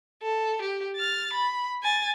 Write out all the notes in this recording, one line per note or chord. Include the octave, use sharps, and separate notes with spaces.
A4
G4
F6 A6
B5
G#5 A6